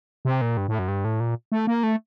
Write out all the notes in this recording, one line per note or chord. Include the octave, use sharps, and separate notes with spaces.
C3
A#2
G2
A2
F#2
G2
A2
A#2
A3
A#3
A3